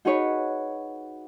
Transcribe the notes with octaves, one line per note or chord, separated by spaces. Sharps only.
D#4 F#4 G#4 B4 C#5